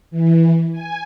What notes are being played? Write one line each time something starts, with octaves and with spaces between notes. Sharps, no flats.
E3
G#5